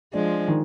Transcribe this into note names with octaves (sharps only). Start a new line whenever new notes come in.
F3 G#3 D4
D#3